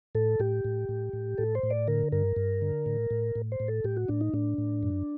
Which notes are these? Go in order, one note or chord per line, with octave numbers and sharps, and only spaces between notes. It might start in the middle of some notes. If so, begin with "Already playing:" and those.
A2 A4
A2 G4
A2
A2
A2
A2 A4
C5
A2
D5
D3 A#4
G2 A#4
G2
D3
A2
A2
A2
C5
A2
A4
A2 G4
F#4
A2 D4
D#4
A2 D4
A2
F#2